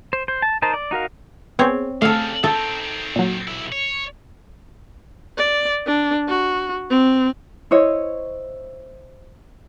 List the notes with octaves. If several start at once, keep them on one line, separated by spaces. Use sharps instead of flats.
C5
C5
A5
D#4 A#4 C5 A5
D5
D#4 F#4 A#4 F5
B3 C4 G#4 C#5
C#3 G3 A3 A4 F5
D#3 C4 A4
A#2 F#3
B1 E4
C#5
D5
D4
F#4
C4
E4 C5 C#5 D#5